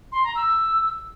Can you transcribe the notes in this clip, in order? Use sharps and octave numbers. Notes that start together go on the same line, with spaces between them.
C6
A#5
E6